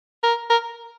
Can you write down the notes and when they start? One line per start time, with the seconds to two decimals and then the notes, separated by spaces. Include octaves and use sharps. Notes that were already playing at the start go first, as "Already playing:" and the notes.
0.23 A#4
0.50 A#4